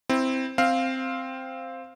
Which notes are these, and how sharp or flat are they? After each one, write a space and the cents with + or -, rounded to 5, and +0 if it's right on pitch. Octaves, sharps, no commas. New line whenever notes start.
C4 +0 E4 +0
C4 +0 F5 +0